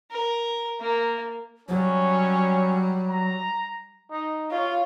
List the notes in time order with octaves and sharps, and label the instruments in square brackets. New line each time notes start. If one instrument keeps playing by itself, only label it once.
[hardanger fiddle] A#4
A#3
[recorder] F#3 [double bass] G3 [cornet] C#4
[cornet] A#5
[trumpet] D#4
[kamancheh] F4 [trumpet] C#5